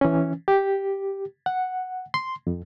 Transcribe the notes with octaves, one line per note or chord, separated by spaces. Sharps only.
E3 C#4
G4
F#5
C6
F2